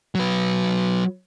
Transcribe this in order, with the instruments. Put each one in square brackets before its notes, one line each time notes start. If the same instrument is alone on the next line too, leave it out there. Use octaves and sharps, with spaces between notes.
[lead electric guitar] F#3 B4